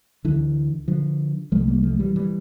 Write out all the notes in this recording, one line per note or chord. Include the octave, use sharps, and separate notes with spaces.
D2 D3 E3
D3 F3
C2 C3 F3 A3
G3 A#3
F3 A3
E3 G3
E3 G3